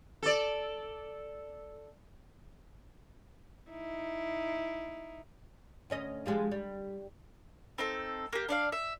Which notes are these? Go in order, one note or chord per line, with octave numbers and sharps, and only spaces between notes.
A4 D5
D#4 E4
D2 C#4 D#5
F3 G3 G#3
G3
C4 D#4 A4
A#3 G4
D4 D5 F5
E5